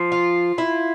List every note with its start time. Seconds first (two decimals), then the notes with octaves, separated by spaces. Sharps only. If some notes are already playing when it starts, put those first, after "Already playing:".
Already playing: F3
0.12 F4
0.58 E4